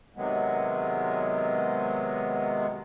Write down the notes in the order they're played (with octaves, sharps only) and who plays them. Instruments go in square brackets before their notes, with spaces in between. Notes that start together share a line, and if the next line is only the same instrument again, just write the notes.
[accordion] C3 D#3 F#3 G#3 B3